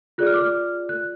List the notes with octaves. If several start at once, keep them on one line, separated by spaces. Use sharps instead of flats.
F4 G#4 D5 F#6
F6
D6
F6
F#6